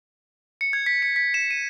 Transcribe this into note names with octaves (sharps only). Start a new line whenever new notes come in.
C#7
G#6
B6
C#7
B6
E7
D#7